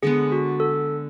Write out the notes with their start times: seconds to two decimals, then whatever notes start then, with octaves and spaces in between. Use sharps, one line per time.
0.03 D3 G#3 B3 G#4
0.32 F#4
0.60 A4